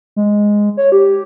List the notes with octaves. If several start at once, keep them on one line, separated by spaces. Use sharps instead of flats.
G#3
C#5
G4